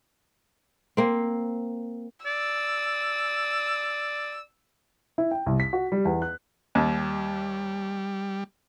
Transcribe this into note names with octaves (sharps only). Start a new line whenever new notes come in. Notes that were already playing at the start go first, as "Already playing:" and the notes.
A#3 C4
D5 E6
E4
G5
C2
B6
F#4
G3
E2
F#6
D#2 G3